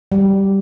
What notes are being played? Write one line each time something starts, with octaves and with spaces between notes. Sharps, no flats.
G3